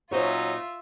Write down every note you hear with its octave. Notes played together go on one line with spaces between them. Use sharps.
A#2 F#3 C#4 D#4 F4 C5 C#5 E5